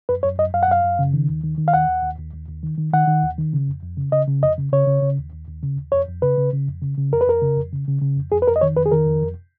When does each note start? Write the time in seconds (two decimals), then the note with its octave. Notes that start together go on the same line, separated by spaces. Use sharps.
0.09 F#2 B4
0.23 F#2 C#5
0.39 F#2 D#5
0.53 F#2 F5
0.63 F#5
0.68 F#2 F5
0.84 F#2
0.99 C#3
1.13 D#3
1.29 D#2
1.44 D#3
1.58 D#3
1.68 F5
1.74 D#2 F#5
1.88 D#2
2.03 D#2
2.19 D#2
2.34 D#2
2.49 D#2
2.63 D#3
2.78 D#3
2.93 D#3 F#5
3.07 D#3
3.23 D#2
3.38 D#3
3.53 C#3
3.68 F2
3.83 F2
3.97 C#3
4.12 C#3 D#5
4.27 C#3
4.42 F2 D#5
4.58 C#3
4.72 C#3 C#5
4.87 C#3
5.02 C#3
5.18 D#2
5.33 D#2
5.48 D#2
5.63 C#3
5.77 D#2
5.92 F2 C#5
6.08 F2
6.22 C#3 B4
6.38 C#3
6.53 C#3
6.68 F2
6.82 C#3
6.97 C#3
7.13 F2 A#4
7.21 B4
7.27 F2 A#4
7.42 C#3
7.57 F2
7.73 C#3
7.88 C#3
8.01 C#3
8.17 F2
8.32 F2 G#4
8.42 B4
8.47 F2 A#4
8.56 D#5
8.61 D#3 C#5
8.76 F2 B4
8.86 G#4
8.91 D#3 A#4
9.06 F2
9.22 F2